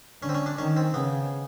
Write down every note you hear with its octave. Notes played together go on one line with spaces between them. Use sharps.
D3 C#4
C4
C#4
D4
D#3 C#4
C4
C#3 B3